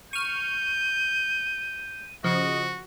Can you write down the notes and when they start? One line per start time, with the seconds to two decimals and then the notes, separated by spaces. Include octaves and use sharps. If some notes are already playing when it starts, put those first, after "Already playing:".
0.13 C#6 F6 G6 D#7
2.24 C#3 F3 F#4 D#5